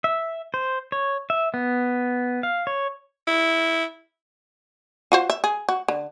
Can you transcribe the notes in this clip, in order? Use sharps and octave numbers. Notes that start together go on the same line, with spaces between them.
E5
C5
C#5
E5
B3
F5
C#5
E4
F4 F#4 C5
E5
G#4
F#4
D3